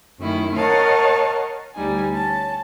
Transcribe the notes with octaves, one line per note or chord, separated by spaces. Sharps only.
F#2 D#3 A3 C#4 E4
A#4 C#5 D#5 F5 F#5 A5
D2 G3 D#4 G#5
C#4 A5